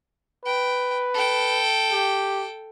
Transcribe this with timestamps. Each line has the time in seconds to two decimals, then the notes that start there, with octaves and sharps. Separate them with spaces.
0.45 B4 G5
1.14 A4 G5
1.92 G4